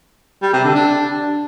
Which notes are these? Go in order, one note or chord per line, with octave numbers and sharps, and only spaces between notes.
G3
C3
D3
D4